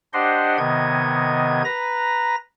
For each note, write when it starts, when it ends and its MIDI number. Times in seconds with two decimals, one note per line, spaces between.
0.13 0.58 62
0.13 0.58 67
0.13 0.58 72
0.13 0.58 75
0.13 0.58 78
0.13 0.58 84
0.58 1.62 48
0.58 1.62 51
0.58 1.62 59
0.58 1.62 75
0.58 1.62 92
1.64 2.36 71
1.64 2.36 82
1.64 2.36 94